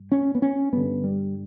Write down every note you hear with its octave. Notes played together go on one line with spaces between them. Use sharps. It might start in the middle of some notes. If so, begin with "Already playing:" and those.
Already playing: G2
C#4
B3
C#4
G2 D3 B3
G3